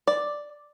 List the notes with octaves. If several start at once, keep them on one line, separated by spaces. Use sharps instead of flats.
D5